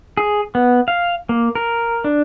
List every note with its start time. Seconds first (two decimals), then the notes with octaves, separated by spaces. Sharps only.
0.17 G#4
0.55 B3
0.88 F5
1.29 A#3
1.55 A#4
2.04 D4